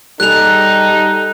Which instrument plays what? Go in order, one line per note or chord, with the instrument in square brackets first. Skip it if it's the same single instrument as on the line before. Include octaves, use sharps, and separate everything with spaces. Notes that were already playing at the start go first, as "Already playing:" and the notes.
[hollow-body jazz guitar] G3 G#4 [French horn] D#4 [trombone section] A4 [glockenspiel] F#6 F7